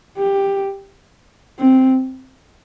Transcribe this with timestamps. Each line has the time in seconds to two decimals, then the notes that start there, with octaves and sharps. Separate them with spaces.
0.18 G4
1.60 C4